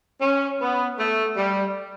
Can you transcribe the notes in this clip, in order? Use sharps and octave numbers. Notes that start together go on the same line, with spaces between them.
C#4
B3
A3
G3